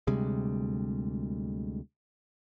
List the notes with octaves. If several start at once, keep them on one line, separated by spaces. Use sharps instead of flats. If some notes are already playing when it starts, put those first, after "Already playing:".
D2 C3 G3 G#3